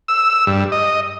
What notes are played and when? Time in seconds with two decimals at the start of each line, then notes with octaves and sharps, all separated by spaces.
0.08 E6
0.47 G2
0.72 D#5